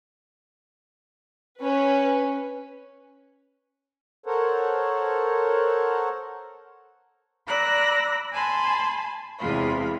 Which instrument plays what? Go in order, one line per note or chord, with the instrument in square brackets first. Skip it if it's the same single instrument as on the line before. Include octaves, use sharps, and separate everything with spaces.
[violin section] C#4 B4
[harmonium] A4 A#4 C5 C#5 F#5
[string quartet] D5 A#5 B5 E6 F#6 A#6
G#5 A5 B5 C6
E2 C3 E3 G#3 F4 B5